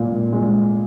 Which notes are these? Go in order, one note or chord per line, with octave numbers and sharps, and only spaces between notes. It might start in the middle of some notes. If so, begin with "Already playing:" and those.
Already playing: A#2 G#3
G#3